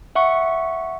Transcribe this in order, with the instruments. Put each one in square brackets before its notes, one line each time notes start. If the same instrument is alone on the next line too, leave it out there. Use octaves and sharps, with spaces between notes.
[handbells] E5 F#5 C#6